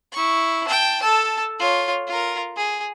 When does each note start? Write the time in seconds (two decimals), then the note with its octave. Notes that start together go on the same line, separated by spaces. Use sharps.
0.12 E4 C#6
0.67 G5 A5
1.02 A4 A5
1.60 F4 C#5
2.08 F4 A#4
2.56 G#4